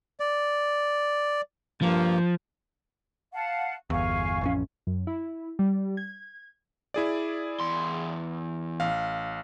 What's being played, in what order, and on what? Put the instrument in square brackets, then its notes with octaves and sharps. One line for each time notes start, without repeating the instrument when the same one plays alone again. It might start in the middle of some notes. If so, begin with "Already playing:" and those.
[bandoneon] D5
[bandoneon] G2 A#3 [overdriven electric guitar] F3
[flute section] F5 F#5 A5
[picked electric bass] G1 E2 [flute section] F5 G#5 C#6
[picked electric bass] A1 F2 C#4
[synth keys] F#2
E4
G3
G#6
[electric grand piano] E4 G#4 D5
[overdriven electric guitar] E2 C6
[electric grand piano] A1 F5